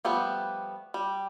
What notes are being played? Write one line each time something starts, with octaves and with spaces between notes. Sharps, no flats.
F3 G3 A3 B3
G3